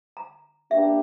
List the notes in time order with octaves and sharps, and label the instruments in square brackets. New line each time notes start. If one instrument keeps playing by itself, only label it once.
[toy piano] A#5
[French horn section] A#3 D4 G4 [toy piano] E5